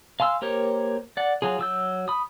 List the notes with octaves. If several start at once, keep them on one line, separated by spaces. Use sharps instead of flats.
F5 G#5 C6 E6 F6
A#3 G4 A#4 C5 C#5
D5 F#5
F#3 F4 G#4
F#3 E6 G6
B5 D#6